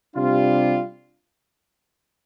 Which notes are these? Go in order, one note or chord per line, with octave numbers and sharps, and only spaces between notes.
C3 G3 D4 F4